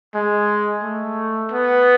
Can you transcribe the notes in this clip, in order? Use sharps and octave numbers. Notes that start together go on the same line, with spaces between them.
G#3
A3
B3